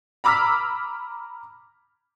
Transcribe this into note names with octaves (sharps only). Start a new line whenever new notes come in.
A#5 B5 D6 E6 F6 B6